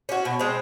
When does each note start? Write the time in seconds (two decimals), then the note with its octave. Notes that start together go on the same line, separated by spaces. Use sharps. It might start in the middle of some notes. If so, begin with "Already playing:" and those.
0.09 C#4 F#4
0.25 B2
0.39 G#3 C4